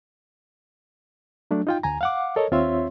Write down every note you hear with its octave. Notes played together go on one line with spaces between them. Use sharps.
F#3 A3 D4
D#4 F4 G5
D2 G#5 A#5
F5 F#5 D6
A4 A#4 C#5 D#5
D#2 C4 F4 C#5 E5 C6